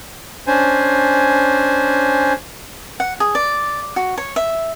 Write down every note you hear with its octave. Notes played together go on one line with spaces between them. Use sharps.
C#4 D4 C5 G#5
F#5
G#4
D5
F#4
C#5
E5